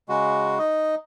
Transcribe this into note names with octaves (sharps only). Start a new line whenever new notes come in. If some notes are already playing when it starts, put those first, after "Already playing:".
C#3 G#3 F#4
D#4 D#5